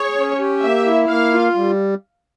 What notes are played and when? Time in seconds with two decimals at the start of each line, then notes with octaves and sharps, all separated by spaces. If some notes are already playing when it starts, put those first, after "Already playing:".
Already playing: G#4 C#5
0.16 C#4
0.39 G4
0.62 A#3 E5
0.86 E4
1.08 A#3 F5
1.32 F4
1.55 G3